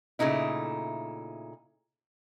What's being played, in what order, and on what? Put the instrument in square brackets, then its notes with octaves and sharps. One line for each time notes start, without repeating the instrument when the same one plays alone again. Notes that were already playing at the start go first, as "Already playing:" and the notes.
[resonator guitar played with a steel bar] A#2 C#3 A3 D#4 E4